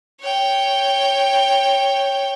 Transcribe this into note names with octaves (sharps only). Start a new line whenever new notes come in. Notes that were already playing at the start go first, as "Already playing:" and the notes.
C#5 G5